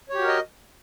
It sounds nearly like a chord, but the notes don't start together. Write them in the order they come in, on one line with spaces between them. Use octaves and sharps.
C#5 G4 F#4 A#4 D#5